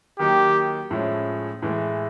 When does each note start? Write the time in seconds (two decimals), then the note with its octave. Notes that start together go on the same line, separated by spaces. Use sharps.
0.19 D#3 F#3 A#3 D#4 G4
0.91 A2 F3 G#3 C#4 E4
1.62 A2 E3 G#3